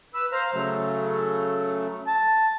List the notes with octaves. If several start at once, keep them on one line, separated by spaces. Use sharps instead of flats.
B4 E6
C5 F5 A#5
C#3 F#3 A3
A5